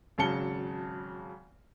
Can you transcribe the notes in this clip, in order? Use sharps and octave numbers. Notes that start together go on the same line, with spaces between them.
G#1 C#3 F#3 A5 C#7 G7